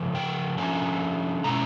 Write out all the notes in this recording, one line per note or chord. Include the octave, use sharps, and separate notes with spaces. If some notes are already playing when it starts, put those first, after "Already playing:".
Already playing: C#3 F3 A3
G5
D3 F3 A3 C#4 G#5
B2 G#3 C#4 E4 A#5